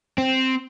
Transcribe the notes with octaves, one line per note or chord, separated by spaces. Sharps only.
C4